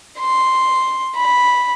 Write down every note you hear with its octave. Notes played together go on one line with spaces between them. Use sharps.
C6
B5